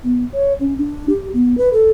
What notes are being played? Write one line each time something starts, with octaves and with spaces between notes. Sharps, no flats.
B3
C#5
C#4
D4
G4
B3
B4
A4